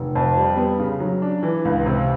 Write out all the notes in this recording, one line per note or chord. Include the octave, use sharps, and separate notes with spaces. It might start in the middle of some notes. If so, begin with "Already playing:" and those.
Already playing: F1
F2
G3
B3
C#3
F#3
D4
E3
C#2
C3